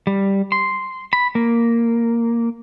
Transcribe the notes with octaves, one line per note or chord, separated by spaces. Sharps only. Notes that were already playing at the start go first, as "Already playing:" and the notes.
G3
C6
B5
A#3